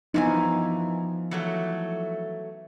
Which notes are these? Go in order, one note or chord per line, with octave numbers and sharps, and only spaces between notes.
G2 E3 F3 B3 D#4 G#5
E3 F#3 A3